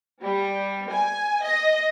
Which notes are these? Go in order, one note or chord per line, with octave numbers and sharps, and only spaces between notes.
G3
G#5
D#5